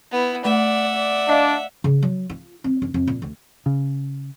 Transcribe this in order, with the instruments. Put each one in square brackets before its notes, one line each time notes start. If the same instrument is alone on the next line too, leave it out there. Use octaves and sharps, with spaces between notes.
[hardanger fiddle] B3 E4
[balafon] A3 [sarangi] D5 [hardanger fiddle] E5 F#5
[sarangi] D5
[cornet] D4 [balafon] D#5 F5
[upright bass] C#3
F#3
F4
C4
F#2
F2
A#2
D2
[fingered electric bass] C#3